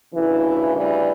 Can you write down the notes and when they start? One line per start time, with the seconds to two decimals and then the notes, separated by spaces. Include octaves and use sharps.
0.13 D2 C#3 E3
0.76 E3 G3